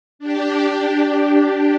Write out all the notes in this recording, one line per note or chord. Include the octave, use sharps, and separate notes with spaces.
D4 G4